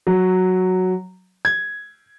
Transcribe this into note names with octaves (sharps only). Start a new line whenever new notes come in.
F#3
G#6